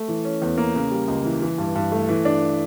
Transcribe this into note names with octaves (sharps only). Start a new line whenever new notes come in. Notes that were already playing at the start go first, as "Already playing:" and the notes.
Already playing: A3
E3
C#4
E2
A#3
C#3
G3
C#2
E3
E3
G2
G2
A3
E3
D4